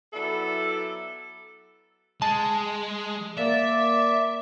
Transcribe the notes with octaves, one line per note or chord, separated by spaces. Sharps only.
F#3 B3 E4 A4 D5 E5
G#3 A5
A#3 D5 E5